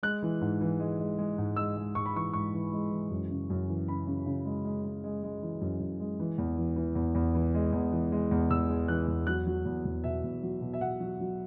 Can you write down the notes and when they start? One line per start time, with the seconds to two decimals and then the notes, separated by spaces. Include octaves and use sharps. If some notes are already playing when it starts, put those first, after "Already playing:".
0.03 G#3 F#6
0.22 E3
0.41 G#2
0.61 E3
0.80 G#3
0.99 G#3
1.18 G#3
1.38 G#2
1.56 G#3 E6
1.76 G#3
1.95 G#2 C#6
2.06 B5
2.15 E3 C#6
2.33 G#2 C#6
2.54 E3
2.73 G#3
2.91 E3
3.11 F#2
3.30 C#3
3.50 F#2
3.69 E3
3.88 C#3 B5
4.07 C#3
4.26 C#3
4.45 G#3
4.65 G#3
4.84 G#3
5.04 G#3
5.23 G#3
5.42 E3
5.61 F#2
5.80 F#2
6.00 G#3
6.20 E3
6.38 E2
6.57 E3
6.76 E3
6.95 E2
7.15 E2
7.35 E3
7.54 G#3
7.73 E2
7.92 E3
8.12 G#3
8.31 E2
8.50 E2 E6
8.69 G#3
8.88 E3 F#6
9.08 E2
9.27 F#3 F#6
9.47 F#3
9.66 E2
9.85 E2
10.04 B2 E5
10.24 E2
10.43 F#3
10.61 B2
10.73 E5
10.81 B2 F#5
11.00 F#3
11.20 F#3